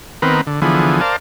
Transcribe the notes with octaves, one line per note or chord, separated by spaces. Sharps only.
D#3 B3 C4 A#4 B4
D3
D3 E3 F3 B3 G#4
A#4 C5 D5 F5 A5